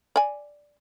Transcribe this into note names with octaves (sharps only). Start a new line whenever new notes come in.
D5 G#5